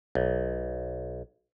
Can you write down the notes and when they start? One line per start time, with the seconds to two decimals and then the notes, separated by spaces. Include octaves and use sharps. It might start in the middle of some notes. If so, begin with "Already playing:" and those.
0.15 B1